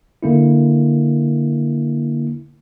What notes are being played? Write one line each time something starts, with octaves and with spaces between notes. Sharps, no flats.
D3 A#3 E4